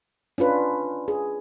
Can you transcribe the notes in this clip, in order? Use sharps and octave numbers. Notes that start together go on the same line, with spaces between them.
C#4 D4 F4 B4
G#4